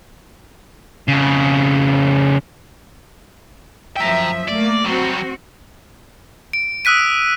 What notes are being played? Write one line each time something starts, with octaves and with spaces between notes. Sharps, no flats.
F2 C#3
F#2 F3 E5 G5 A#5
A3 A#3 D5
F#3 G3 C4 F#4
D7
D#6 E6 F#6 B6 D#7